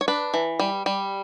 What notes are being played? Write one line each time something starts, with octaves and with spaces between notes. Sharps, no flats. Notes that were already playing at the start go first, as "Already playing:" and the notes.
C#5
D4 B4
E3
G3
G3